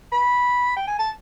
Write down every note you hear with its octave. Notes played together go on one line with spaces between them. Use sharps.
B5
G5
G#5
A5